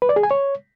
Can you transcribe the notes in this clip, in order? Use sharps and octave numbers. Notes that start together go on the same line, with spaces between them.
B4
D5
G#4
G#5
C#5